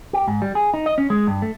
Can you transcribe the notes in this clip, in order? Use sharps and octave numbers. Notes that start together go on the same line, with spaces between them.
G4
G#2
G3
G#4
D#4
D#5
C#4
G#3
G2
A3